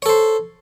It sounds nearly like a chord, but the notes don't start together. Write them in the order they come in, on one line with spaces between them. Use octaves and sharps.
C#5 A4 C5